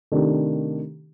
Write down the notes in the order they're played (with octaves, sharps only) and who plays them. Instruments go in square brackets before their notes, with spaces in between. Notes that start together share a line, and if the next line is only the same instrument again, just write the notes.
[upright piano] C3 D#3 A3 D4 G4